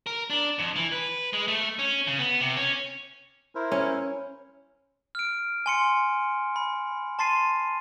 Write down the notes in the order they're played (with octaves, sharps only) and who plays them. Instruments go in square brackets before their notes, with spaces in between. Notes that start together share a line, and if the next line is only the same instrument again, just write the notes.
[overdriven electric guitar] A#4
D4
F2
E3
B4
G#3
A3
C#4
C#3
B3
C3
C#4
[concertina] E4 A#4 C5
[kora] C#4
[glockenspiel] F6 D7
G#5 C6 C#7
B5
A5 C6 A6 C7 D#7